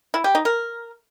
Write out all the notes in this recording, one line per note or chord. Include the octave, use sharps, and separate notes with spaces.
E4
G4
D#4
A#4